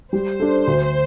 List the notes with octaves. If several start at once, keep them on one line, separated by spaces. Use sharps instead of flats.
G3 C5
D4 A4
D2